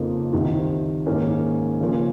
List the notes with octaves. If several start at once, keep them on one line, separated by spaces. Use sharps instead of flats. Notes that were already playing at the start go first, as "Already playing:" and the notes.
Already playing: F2 C#3 F3 A#3 D#4
C2 C3 D#3
G#2 D#3 A#3 C#4
C#3 F3 A#3 C#4